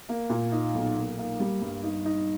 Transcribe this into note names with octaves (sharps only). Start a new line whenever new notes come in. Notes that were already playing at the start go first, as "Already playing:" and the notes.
A#3
A#2
D#4
B1
A#3
A#3
G3
G2
D#4
D#4